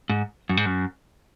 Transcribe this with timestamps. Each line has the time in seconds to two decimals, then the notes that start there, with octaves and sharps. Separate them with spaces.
0.09 G#2
0.49 F#2
0.57 G#2
0.66 F#2